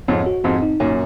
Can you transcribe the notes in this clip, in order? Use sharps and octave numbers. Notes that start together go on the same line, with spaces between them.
F2 G#2 C#5
F#4
F2 G#2 C4
D#4
F#2 A#2 C#5